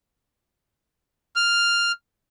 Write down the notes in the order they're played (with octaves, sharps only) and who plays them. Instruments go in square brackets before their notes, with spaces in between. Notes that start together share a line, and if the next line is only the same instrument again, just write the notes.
[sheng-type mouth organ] F6